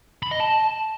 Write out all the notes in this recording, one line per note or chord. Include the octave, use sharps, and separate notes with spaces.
B5
D#5
A5